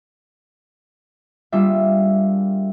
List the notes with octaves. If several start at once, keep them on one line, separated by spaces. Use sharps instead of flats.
G3 A#3 D4 F4 G#4 E5